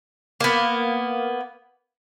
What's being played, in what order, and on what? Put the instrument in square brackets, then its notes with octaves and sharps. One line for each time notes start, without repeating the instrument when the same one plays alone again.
[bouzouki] A#3 B3